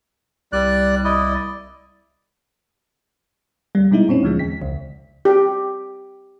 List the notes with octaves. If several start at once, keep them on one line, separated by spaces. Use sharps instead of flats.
C2 G3 D5 F#6
E4 D5 D#5
D2 G3
B2 G#3 D#4 E4
F#2 A#2 C4 C#4
D2 D3 F3 G#3
E2 B6
C#2
G4